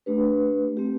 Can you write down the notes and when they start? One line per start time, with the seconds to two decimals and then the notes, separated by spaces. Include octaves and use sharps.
0.06 A3 D4 G4 B4
0.77 A3 C4 G4